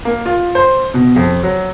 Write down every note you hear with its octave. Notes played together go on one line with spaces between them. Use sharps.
A#3
F4
C5
B2
F2
F#3